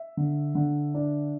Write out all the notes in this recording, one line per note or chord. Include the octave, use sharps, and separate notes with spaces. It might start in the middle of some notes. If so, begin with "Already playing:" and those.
Already playing: E5
D3
D3
D4